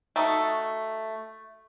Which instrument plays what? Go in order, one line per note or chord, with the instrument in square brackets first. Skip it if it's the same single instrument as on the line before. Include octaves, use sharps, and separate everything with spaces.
[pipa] A3 D#4 F#4